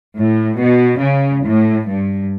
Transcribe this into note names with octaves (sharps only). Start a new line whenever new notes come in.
A2
B2
C#3
A2
G2